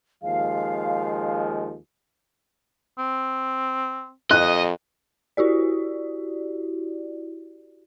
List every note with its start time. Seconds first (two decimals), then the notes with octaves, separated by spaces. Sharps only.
0.23 D#2 F3 G#3 F5
2.98 C4
4.31 F2 D#5 F#6
5.37 E4 F#4 G4 D5